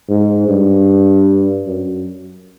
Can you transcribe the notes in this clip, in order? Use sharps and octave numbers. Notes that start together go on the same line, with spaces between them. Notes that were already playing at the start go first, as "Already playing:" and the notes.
G#2
G2
F#2